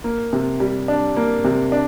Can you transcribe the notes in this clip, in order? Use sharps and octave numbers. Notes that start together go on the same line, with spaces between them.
A#3
C3
G3
D4
A#3
C3
D4